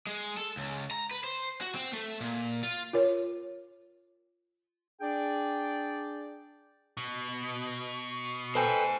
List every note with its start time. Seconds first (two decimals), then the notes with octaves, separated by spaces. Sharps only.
0.07 G#3
0.37 A4
0.57 C#2
0.91 A#5
1.11 B4
1.24 C5
1.61 F#4
1.75 C4
1.93 A3
2.21 A#2
2.63 F4
2.93 F4 A#4 C#5
5.01 D4 G#4 D5 G5
6.97 B2
8.55 A4 B4 C5 G5 G#5